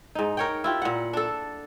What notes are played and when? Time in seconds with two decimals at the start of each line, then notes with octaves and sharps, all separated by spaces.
0.15 G#2 D#4
0.37 A#4 C#5 G5
0.64 E4 F4 G4
0.82 A#2 F#5
1.13 D4 A4